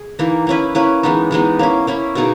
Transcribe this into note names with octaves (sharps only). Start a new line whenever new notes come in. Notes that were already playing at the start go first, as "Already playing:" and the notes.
Already playing: G#4
E3 A#3 D#4
A#3 C#4 E4 B4
A#3 C#4 E4 B4
E3 G#3 B3 D#4
E3 G#3 B3 D#4
A#3 C#4 E4
A#3 C#4 E4
B2 A#3 D#4 G#4